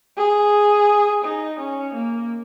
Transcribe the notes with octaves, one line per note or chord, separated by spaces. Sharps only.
G#4
D#4
C#4
A#3